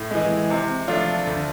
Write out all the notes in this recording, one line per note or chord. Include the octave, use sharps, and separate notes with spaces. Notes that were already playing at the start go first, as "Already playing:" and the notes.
Already playing: A2
E3 G#3
C3
F3 A3 D4 F4
D2